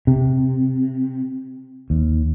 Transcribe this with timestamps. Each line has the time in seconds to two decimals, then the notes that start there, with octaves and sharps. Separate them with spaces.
0.07 C3
1.90 D#2